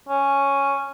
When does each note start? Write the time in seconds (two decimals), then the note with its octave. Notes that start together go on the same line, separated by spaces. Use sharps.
0.09 C#4